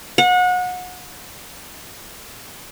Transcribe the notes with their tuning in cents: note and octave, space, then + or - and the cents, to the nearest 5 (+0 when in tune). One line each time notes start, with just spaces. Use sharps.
F#5 -30